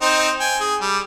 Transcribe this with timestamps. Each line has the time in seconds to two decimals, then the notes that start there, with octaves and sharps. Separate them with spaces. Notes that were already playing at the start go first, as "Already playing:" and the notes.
0.01 C4 D#4 C5
0.40 G5 G#5
0.60 G#4
0.81 G3